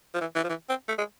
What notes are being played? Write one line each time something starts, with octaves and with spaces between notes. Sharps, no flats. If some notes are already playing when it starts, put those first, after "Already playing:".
F3
E3
E3
F3
E3
C4
A3
G#3